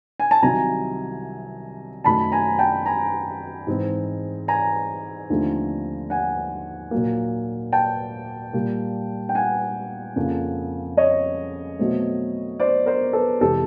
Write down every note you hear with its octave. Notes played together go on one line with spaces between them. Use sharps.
G#5
A5
C2 C3 D#3 F#3 G#5 A#5
F#2 D#3 F#3 A3 A5 B5
G#5 A#5
G5 A5
G#5 A#5
G#2 E3 G#3 C4
G#5 A#5
D#2 D3 F3 A3 C4
F#5 G#5
A#2 F#3 A#3
G5 A5
A#2 G3 A#3
G5
F#5 G#5
F2 C#3 F3 A#3
C#5 D#5
B2 F#3 A3 C4
C5 D5
A#4 C5
A4 B4
F2 C3 E3 G#3 G4 A4